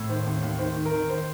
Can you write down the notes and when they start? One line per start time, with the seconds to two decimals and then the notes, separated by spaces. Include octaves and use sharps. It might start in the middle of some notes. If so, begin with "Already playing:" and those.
Already playing: A2
0.09 D#3 C5
0.26 D#2
0.43 D#2
0.59 D#3 C5
0.76 D#3
0.85 A#4
0.93 D#3
1.09 D#3 C5